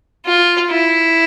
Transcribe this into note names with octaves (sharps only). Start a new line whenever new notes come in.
F4
E4